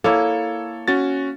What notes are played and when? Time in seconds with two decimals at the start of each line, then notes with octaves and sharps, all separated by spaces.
0.04 A#3 E4 A4 C#5
0.88 C#4 F#4 A6